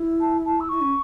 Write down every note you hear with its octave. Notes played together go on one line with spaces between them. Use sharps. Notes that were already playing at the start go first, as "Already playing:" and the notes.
Already playing: E4
A5
A5
E6
E4 C#6
C#4